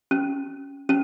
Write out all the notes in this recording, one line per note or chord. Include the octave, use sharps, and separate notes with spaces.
C#4
C#4